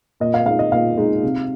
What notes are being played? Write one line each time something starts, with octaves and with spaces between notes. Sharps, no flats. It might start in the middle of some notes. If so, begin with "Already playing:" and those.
A#2 D#5
F5
G#3 D#4 F5
D#5
A#2 F5
G#3 D#4
C3